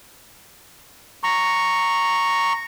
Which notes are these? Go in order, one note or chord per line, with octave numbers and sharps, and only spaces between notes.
A#5 C#6